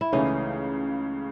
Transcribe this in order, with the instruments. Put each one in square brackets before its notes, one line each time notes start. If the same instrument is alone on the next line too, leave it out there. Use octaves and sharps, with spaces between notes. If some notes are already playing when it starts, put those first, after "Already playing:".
[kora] E4
[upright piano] C#2 C#3 E3 A3 [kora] C#4 D#4